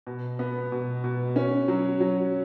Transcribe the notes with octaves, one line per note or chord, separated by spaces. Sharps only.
B2
B3
B2
B2
C#4
F#3
F#3